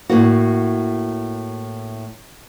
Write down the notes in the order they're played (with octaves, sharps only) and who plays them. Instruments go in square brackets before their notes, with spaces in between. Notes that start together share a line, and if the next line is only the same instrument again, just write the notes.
[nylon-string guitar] A2 A#3 F#4